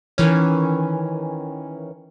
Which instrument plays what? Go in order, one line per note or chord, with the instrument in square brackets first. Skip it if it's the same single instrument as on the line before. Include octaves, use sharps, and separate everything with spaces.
[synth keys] D#3 E3 C#4